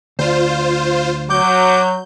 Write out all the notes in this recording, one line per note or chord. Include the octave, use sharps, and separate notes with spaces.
D2 F4 C5
F#3 D6 G6